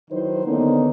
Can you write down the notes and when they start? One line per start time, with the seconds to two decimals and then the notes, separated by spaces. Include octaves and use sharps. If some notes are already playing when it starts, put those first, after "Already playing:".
0.10 D#3 F#3 D#4 E4 B4 C5
0.45 D3 D#3 A#3 B3 C#4 D#4